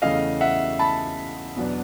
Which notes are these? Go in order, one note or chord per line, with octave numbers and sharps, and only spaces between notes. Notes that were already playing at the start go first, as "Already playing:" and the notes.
E2 C#3 E3 A3 C#4 D#5 F5
E5 F#5
A5 B5
E2 B2 F#3 B3 D4